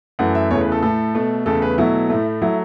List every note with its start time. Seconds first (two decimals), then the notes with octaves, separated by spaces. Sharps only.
0.19 F#2 E3 A3 F#5
0.35 E5
0.50 E2 C#3 E3 A3 C#5
0.61 B4
0.72 A4
0.82 A2 A3 A4
1.15 B2 A3
1.46 E2 C#3 A3 A4
1.62 B4
1.78 B2 F#3 A3 E4
2.10 A2 A3
2.42 F#3 A3 E4